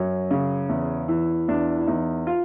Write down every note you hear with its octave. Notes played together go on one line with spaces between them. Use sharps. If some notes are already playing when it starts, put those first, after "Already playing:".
Already playing: F#2 C#4
C#3
E2
E3
E2 D4
E4
E2 D#4
F4